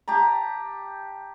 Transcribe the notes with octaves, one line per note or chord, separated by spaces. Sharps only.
G4 A5 A#5